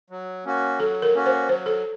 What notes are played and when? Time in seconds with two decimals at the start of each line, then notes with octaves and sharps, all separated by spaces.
0.10 F#3
0.45 A#3 C#4 F#4
0.79 F#3 A4
1.02 A#4
1.14 A#3 C#4 F#4
1.26 C5
1.49 F#3 C5
1.66 A4